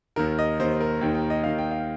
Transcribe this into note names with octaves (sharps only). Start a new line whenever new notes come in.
D#2 D#3 A#4
D#5
D#2 D#3 C5
A#4
D#2 D#3 G5
G5
D#5
D#2 D#3 F5
G5
F5